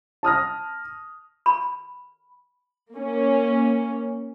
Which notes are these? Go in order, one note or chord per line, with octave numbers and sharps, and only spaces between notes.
A5 D#6 F6 A#6
B5
A#3 C#4